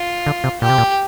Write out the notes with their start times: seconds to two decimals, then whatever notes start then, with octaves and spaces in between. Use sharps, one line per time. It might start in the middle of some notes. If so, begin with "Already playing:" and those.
Already playing: F4
0.26 D3
0.44 C3
0.61 A#2 G4
0.70 C3
0.78 A#2